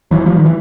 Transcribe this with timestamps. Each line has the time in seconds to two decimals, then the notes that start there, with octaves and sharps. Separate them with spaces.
0.11 E3 F#3
0.26 F3 G3
0.36 D#3
0.46 E3